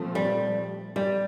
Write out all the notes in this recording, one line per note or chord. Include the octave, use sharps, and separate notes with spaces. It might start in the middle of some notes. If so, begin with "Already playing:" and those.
Already playing: A#2 F3 A3 C4
G3
G3